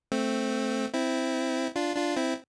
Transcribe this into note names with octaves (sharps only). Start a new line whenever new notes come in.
A3 C4
C4 E4
D4 F4
D4 F4
C4 E4